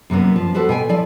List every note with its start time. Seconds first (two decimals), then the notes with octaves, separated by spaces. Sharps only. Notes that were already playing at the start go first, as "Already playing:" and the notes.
0.10 F#2 C3 A#3 B3
0.36 F3
0.54 F#4 G4 A4 B4 C5
0.69 B2 G5 G#5
0.89 F3 E4 D5